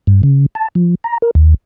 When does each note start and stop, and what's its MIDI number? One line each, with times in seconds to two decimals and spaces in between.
0.07 0.22 43
0.23 0.46 49
0.55 0.68 81
0.75 0.95 53
1.04 1.18 82
1.22 1.31 70
1.35 1.54 39